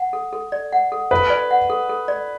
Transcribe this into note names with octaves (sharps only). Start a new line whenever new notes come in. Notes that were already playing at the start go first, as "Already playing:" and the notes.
Already playing: F#5
A4
A4
D5
F#5
A4
A4 B4
D5
F#5
A4
A4
D5